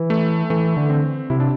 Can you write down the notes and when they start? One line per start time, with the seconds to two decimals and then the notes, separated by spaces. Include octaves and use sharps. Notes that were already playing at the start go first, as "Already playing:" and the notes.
Already playing: E3
0.10 A3
0.50 E3 A3
0.77 D3
0.90 C4
1.30 C3 E4
1.40 D4